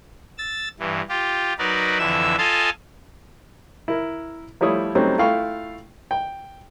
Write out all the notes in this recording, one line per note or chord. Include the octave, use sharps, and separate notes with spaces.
E6 A6
G2 E3
F4 G4
F#3 D#4 A#4 B4 D5
F2 D3 E3 E5 E6
F4 A4 D#5 F5 G#5 A5
E4 A#4
F3 G3 A3 E4 C#5 D#6
F#3 G3 A3 C4 C#4 D#4
A3 E4 F4 F5 G5 C#6
G5